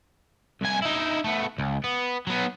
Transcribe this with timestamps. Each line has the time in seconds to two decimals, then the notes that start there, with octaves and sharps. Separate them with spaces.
0.61 C2 G#5
0.82 D#4 E4
1.24 A3 B3
1.58 C#2
1.84 B3
2.27 F#3 B3